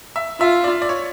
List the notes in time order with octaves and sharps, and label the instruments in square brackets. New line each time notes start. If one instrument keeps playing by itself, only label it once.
[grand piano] E5
[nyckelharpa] F4 [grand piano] E5
[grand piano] D5
D5
C#5